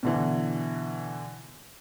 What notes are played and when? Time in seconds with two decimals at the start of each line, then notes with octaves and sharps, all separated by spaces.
0.03 B2 D3 E3